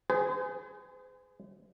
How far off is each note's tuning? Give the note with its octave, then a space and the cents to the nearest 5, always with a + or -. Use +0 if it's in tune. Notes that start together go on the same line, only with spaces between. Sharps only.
G#4 +0 C5 -45 G#5 -15